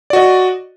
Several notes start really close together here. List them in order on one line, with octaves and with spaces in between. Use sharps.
D5 F#4 D#5